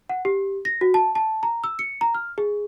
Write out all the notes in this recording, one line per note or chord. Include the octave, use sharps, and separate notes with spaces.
F#5
G4
A#6
F#4
A5
A5
A#5
E6
C#7
A#5
F6
G#4